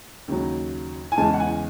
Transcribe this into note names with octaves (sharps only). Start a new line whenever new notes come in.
D#2 C#3 F#3
G#5
E2 C#3 E3 G#3 A5
F#5
G#5